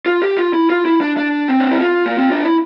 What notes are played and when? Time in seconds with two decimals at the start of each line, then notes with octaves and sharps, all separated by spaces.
0.06 F4
0.22 G4
0.37 F4
0.54 E4
0.70 F4
0.85 E4
1.01 D4
1.17 D4
1.48 C4
1.60 D4
1.71 E4
1.80 F4
2.06 A#3
2.18 C4
2.32 D4
2.45 E4